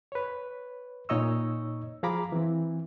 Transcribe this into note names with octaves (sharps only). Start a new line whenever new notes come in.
B4 C#5
A#2 D#4 C#5 D#5 C#6 E6
F3 G#4 F5 A#5 B5 D6
E3 C4